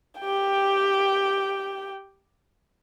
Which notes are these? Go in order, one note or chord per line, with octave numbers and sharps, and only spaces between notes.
G4 G5